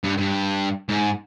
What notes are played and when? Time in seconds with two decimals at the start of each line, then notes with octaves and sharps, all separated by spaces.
0.04 G2
0.18 G2
0.89 G#2